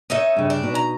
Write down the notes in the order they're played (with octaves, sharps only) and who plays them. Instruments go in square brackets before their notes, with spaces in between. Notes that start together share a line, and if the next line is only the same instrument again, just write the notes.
[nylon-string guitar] C#4 D#5 [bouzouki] D#4 C#5 E5
[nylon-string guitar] G2 C#3
[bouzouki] D4
[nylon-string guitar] B2 D#4
[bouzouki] A#5